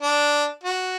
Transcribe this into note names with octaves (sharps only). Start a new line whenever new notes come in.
D4
F#4